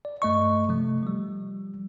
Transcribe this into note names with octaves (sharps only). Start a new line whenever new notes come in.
D5
G2 A3 D#5 C#6
C3 F3 A3
F3 G3